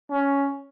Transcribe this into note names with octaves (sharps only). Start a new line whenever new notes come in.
C#4